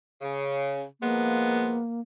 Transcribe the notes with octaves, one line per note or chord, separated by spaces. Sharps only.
C#3
F3 G#3 A#3 B3